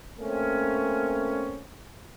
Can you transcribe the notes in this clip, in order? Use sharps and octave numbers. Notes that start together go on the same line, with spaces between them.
A3 A#3 C4 C#4